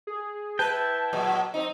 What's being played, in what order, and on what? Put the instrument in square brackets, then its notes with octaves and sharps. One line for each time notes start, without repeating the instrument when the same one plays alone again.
[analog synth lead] G#4
[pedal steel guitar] E4 G5 [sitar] B4 [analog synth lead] A5
[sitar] A#2 F#3 G#3
F#3 C4 D#4